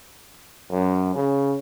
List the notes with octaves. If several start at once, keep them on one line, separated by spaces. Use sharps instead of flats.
F#2
C#3